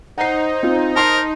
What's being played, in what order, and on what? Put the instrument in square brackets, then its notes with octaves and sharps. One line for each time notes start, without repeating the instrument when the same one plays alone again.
[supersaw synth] D#4 [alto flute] C5 [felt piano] F#5 C7
[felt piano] C4 F4
[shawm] A#4 [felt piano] A5 C6 C7